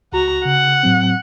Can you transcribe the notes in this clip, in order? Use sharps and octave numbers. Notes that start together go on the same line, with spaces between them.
C#2 F#4 A#5
C#3 F#5
A2 F#3 C4